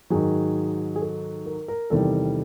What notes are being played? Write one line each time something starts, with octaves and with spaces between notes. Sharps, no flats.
G#2 D#3 F#3 G#4
G#4
A4
A#4
A#4
E2 C3 D#3 G3 A4